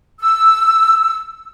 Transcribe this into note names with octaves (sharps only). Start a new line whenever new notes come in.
E6